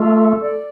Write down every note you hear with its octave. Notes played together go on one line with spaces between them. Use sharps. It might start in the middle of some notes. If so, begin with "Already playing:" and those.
Already playing: A3 F4
A4
D5